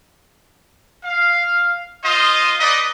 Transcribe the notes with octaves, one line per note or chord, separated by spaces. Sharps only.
F5
F4 C5 D#5
D#4 B4 D5 D#5